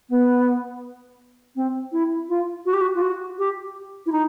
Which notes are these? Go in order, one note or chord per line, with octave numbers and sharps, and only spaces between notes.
B3
C4
E4
F4
F#4
G4
F#4
F4
F#4
G4
E4
D#4